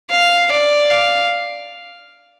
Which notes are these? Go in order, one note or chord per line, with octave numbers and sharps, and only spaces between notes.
F5
D5
F5